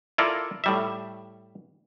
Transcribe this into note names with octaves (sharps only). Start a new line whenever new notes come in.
E4 F4 A4 A#4 D5
A2 G3 E5